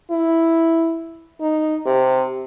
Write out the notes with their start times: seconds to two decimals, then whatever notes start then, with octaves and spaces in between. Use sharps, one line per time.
0.11 E4
1.41 D#4
1.86 C3